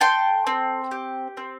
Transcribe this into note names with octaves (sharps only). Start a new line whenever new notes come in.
A4 G5 C6
C4
G4
C4